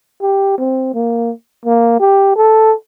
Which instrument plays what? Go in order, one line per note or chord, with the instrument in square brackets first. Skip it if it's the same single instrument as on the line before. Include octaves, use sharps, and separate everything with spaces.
[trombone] G4
C4
A#3
A#3
G4
A4